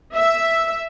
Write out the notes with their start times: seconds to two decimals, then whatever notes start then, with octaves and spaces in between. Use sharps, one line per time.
0.15 E5